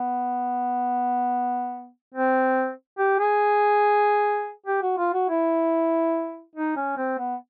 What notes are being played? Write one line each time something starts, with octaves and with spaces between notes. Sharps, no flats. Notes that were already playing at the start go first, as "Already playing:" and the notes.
Already playing: B3
C4
G4
G#4
G4
F#4
F4
F#4
E4
D#4
C#4
C4
B3